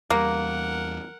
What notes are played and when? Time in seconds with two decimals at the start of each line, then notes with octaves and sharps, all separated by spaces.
0.10 E2 G3 A#3 A#4 F#5